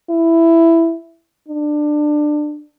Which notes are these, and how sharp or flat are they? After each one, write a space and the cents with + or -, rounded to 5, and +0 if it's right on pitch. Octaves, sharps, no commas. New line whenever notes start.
E4 +5
D4 +20